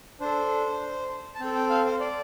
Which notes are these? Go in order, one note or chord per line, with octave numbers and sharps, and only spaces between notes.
D4 A4 C5
A5
C4 A4 G5
G5
F5
C5
D5